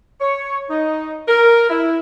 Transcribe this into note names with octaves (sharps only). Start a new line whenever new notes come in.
C#5
D#4
A#4
E4